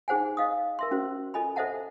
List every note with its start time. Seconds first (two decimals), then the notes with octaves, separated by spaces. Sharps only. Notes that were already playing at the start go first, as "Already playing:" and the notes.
0.08 D#4 G#4 C5 F#5 G#5
0.37 D#5 F5 D#6
0.79 A#4 E5 C6
0.91 C#4 F#4 C5
1.34 F4 A4 D#5 G#5 B5
1.56 A4 C5 D#5 E5 F#5 A5